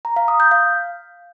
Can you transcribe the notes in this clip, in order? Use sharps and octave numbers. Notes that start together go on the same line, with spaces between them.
A#5
F5
D#6
G6
F5